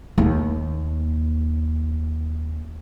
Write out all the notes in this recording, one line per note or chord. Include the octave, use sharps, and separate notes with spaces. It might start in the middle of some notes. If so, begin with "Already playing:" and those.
D#2 A#3